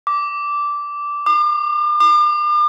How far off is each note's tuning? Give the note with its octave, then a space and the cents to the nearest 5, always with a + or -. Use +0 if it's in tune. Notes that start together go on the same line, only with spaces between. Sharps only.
D6 -10
D6 +40
D6 +40